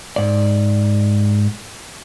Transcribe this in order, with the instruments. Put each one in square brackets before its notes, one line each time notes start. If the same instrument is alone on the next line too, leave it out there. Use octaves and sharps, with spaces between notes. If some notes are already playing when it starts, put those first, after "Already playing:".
[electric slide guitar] G#2 D5